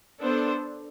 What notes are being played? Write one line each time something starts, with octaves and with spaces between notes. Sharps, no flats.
B3 D4 A4 C5